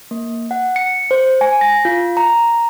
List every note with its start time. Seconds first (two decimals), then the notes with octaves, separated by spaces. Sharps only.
0.11 A#3
0.51 F#5
0.76 C#7
1.11 C5
1.41 G#5
1.61 A#6
1.85 F4
2.17 A#5